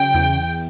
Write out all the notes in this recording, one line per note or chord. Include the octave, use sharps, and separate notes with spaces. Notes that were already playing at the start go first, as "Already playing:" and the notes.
Already playing: C#3 F#3 G5
E2